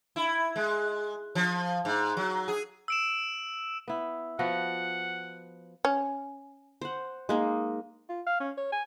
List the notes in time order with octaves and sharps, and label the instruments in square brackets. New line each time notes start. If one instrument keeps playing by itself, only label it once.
[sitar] E4
G#3
F3
G#2
F#3
G#4
[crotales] E6 D7 E7
[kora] B3 E4
[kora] F3 B3 F#4 [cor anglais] F#5
[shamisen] C#4
[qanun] C5 F#5
G#3 A#3 D#4
[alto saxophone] F4
F5
C#4
C#5
G#5